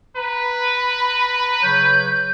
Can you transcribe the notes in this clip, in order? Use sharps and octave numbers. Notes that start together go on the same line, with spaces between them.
B4 A#5 B5
C#3 F#3 C#5 G6